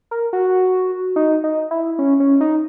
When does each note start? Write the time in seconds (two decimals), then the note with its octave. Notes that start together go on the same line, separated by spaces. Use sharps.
0.11 A#4
0.33 F#4
1.16 D#4
1.44 D#4
1.71 E4
1.99 C#4
2.20 C#4
2.41 D#4